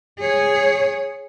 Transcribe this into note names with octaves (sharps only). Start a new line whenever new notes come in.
G#4 C#5